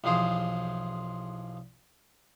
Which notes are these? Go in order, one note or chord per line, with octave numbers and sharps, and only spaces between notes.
B1 E2 F3 G#4 C5